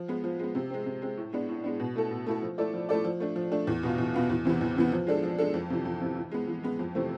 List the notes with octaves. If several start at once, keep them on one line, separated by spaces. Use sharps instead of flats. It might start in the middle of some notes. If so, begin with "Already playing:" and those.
Already playing: F3
G#3 B3
F3
G#3 B3
C3
G#3 C4
C3
G#3 C4
A2
G#3 B3 D4
A2
G#3 B3 D4
B2
A3 E4 A4
B2
A3 E4 A4
F3
A3 E4 A4 D5
F3
A3 E4 A4 D5
F3
A3 D4
F3
A3 D4
E2
B2 B3 F4
E2
B2 B3 F4
E2
C3 E3 B3
E2
C3 E3 B3
F3
G#3 D4 A4
F3
G#3 D4 A4
F2
C3 E3
F2
C3 E3
E3
G#3 B3
E3
G#3 B3
F2
C3 E3 A3 C4